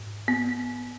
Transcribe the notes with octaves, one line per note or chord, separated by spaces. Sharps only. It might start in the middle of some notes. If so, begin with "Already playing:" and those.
Already playing: G#2
B3